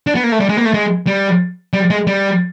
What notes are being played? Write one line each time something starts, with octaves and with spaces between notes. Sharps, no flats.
D4
B3
A#3
A3
G3
G#3
A#3
A3
G#3
G3
G3
G#3
G3